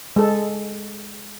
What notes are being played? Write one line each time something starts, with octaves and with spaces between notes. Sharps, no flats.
G#3 A4